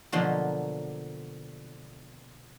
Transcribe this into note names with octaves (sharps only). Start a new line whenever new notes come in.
B2 D3 F3 F#3 A#3